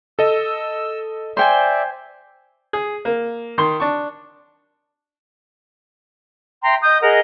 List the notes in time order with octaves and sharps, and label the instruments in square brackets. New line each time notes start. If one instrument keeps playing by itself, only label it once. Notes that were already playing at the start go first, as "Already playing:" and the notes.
[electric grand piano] A4 D#5 [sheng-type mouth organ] E6
[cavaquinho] C5 G5 G#5 [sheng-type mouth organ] D5 E5
[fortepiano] G#4
A#3
D#3 C6
D4 C#6
[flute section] E5 G5 A#5 C6
D#5 D#6 G6
G#4 A#4 D#5 F#5